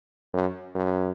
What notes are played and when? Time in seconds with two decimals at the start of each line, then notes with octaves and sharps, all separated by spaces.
0.34 F#2
0.75 F#2